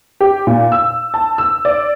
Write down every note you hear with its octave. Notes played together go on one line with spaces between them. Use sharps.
G4
A#2
E6
A5
E6
D5